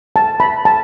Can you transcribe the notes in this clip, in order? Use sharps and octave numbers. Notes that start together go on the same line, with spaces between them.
A5
B5
A5